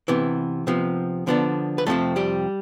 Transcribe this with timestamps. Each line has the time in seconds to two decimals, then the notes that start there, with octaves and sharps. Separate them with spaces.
0.08 C3 E3 B3
0.67 C3 F3 B3
1.27 D3 F3 B3 D4
1.78 B4
1.86 F2 C3 F3 A3 C4 A4
2.16 G3 G4